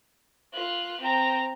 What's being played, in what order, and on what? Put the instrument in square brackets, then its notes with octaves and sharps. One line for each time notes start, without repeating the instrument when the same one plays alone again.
[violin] F4 F#6
C4 A#5